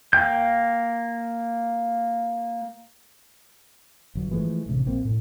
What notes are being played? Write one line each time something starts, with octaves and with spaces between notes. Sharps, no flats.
A#3 G5 G6
G1 F#3
E3 F3 G#3 A3
A1 D2 C3
A#1 A#3 C4
A2